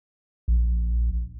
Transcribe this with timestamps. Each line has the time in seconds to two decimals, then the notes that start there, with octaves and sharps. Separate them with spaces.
0.48 A#1